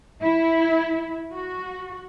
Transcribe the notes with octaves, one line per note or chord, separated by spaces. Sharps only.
E4
F#4